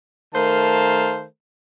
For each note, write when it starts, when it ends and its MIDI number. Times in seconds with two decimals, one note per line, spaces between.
0.34 1.24 51
0.34 1.24 57
0.34 1.24 70
0.34 1.24 72
0.34 1.24 77
0.34 1.24 81